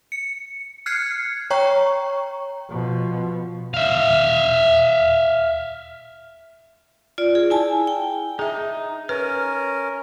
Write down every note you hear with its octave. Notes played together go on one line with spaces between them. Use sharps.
C#7
F6 F#6 G#6 C7 C#7
C#5 G5 A#5 C#6
B2 F3
E5 F5
F4 D5
G#4
E4 G#5 A5
G5
D#4 G#4 E5
C#4 A#4 B4 F6